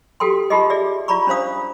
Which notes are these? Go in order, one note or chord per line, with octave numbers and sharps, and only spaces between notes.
F#4 G4 A4 G5 C6
D#4 F4 G4 G#4 D#5
G#4 D5 E5
F4 D5 A#5 B5 C#6
C#4 D4 C5 F5 D#6